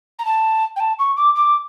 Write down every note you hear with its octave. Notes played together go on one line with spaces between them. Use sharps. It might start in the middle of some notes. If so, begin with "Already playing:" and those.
A#5
A5
G5
A5
C#6
D6
D6